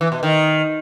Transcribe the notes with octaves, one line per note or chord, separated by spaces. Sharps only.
E3
B2
D#3